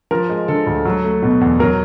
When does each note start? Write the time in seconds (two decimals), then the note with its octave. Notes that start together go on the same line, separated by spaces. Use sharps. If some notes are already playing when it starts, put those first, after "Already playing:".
0.11 F3 A#4
0.29 G#3
0.48 D3 A4
0.67 D2
0.85 F#3
1.04 A3
1.23 B2
1.41 E2
1.60 F#3 A#4